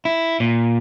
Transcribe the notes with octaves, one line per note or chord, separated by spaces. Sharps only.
E4
A#2